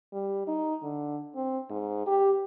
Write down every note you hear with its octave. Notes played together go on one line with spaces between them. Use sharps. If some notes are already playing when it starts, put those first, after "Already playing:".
G3
D#4
D3
C4
G#2
G4